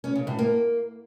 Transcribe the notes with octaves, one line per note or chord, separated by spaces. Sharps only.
C#4
C#3
A2
A#3